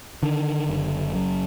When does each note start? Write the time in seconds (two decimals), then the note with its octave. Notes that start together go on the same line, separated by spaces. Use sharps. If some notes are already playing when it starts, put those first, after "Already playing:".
0.23 D3 D#3
0.69 F#1
1.15 F#2